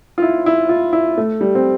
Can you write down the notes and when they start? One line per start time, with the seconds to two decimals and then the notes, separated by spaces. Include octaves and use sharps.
0.18 F4
0.22 E4
0.46 E4
0.69 F4
0.93 E4
1.17 A3
1.41 G3
1.55 C4